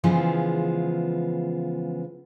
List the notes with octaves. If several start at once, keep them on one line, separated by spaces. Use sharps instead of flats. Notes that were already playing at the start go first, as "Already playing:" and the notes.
C#3 E3 F3 G#3 B3